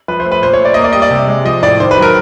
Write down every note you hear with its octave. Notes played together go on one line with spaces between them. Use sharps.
F3 B4
C5
A3
B4
A#2 C5
C#5
A3 D5
A#3 D#5
D5
G3 D#5
D5
C3
G#3
F3 D#5
A2 D5
D#3 C5
B4
F#3
A#4